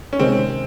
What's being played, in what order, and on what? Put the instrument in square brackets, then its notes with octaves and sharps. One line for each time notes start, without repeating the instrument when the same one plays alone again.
[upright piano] C#4
[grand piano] C3 D#3 G#3 [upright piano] C4